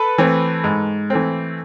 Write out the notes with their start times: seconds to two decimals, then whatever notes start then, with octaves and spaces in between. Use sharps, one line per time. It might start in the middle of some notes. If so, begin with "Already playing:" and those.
Already playing: A4 B4
0.18 E3 A3 C4
0.64 G#2
1.10 E3 A3 C4